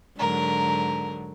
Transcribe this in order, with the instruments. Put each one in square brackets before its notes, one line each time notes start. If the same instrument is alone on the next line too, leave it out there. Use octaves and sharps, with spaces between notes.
[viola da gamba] G#2 D3 F#3 [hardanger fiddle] A#4